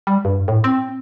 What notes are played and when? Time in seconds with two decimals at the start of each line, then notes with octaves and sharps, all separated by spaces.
0.07 G3
0.25 G2
0.48 A2
0.64 C4